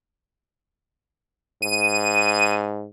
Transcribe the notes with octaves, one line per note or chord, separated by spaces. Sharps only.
G#2 D#7